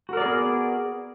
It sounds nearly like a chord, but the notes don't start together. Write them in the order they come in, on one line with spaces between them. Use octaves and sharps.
F#4 A#4 D5 G#4 B3